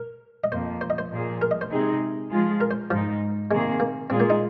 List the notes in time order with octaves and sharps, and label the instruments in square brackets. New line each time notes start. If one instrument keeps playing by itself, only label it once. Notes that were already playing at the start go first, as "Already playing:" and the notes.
Already playing: [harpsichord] A#4
D#5
[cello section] F2 F3 A#3 [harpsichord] C5
[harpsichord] C5
D#5
C5
[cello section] A#2 F3 A#3 G#4
[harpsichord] A#4
D#5
C5
[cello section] C3 G#3 C4 D#4 G#4
F3 G#3 F4 G#4
[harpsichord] A#4
C5
[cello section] G#2 G#3 D#4 [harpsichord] F3
[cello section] C3 D#3 A#3 G#4 [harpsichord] G#3
[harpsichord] A#3
[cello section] A#2 G#3 F4 G#4 [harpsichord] C4
[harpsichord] A#3
D#4